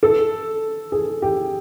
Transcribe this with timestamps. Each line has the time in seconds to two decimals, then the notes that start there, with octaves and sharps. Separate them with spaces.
0.03 A4
0.92 G#4
1.22 G4